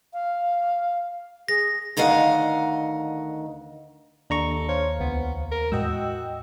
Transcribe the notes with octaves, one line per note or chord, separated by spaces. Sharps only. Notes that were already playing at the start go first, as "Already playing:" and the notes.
F5
G#4 A#6
D2 D#3 D#5 F5 F#5
D#2 D4 A4 A#5 C#6
C5 C#5 F5
C#2 B3
A#4
E2 A2 G#3 F#4 D#5 G5 E6